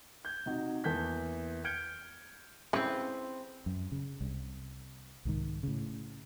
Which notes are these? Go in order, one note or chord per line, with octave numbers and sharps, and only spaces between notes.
G6 G#6
C3 D#4 F#4
E2 E3 A#3 A5 G6 B6
F6 G6 G#6 C#7 D7 G7
C#3 E3 C4 B4
F#2
C#3
C2
C2 G#2 D#3
A2 C#3